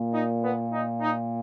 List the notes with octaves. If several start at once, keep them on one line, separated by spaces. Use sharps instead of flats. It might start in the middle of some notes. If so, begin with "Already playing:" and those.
Already playing: A#2
D#4
B3
D#4
D#4